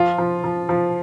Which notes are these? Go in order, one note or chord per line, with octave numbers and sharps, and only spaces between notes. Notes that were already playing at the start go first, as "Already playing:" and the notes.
Already playing: F3 F4
F3
F3
F3